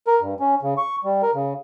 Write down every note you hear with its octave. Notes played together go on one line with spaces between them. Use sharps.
A#4
G2
C#4
C#3
C#6
G3
A#4
C#3